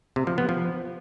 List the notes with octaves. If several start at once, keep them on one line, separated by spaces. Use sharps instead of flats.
C3
F3
B3
F3